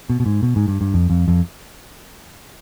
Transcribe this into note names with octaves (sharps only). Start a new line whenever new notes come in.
B2
B2
G#2
B2
G#2
G2
G2
F2
F2
F2